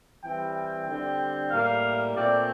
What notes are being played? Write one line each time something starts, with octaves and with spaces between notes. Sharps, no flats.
E3 G3 C4 G5
G5
D3 G3 C4
A2 G3 A#3 F5
A#2 A3 C4 D5